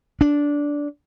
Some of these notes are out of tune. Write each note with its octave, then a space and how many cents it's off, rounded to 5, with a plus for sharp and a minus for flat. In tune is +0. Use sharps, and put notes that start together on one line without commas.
D4 -10